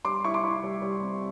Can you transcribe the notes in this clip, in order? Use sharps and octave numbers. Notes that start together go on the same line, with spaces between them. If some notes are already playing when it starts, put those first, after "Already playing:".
G3 C6 D6
E4 C#6
C6 D6
E4
G3
G3
C4